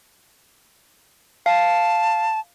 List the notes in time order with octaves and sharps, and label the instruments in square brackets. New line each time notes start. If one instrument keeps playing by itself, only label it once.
[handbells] F5 [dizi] A5